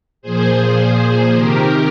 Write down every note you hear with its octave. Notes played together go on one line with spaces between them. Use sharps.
A#2 F3 G#4 C5
A#2 F3 G#4 C5
A#2 F3
C3 D#3 G4 A#4